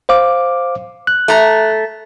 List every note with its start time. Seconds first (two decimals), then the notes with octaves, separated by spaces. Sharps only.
0.09 C5 F5 D6
1.07 F#6
1.28 A3 A#5